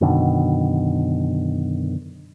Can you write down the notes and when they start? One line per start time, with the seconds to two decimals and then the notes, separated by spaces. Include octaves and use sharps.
0.01 F#2 B2 D3 D#3